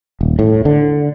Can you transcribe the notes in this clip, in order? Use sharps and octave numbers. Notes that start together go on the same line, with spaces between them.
D#1
A2
D3